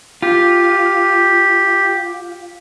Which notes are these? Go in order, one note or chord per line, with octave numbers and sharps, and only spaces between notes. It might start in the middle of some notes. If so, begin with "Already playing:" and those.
F4 G4